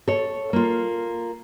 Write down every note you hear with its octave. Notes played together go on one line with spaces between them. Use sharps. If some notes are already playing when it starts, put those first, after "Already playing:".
A4 C#5
A#3 F4